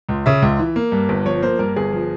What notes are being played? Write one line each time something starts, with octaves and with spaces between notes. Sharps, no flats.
C#2
C#3 E5
C#2
E3
A#3
G2
G1
F3 C#5
A#3 C5
G2 A#4
G1 G#4
F3